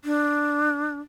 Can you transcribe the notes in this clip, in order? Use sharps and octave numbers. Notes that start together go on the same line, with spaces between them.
D4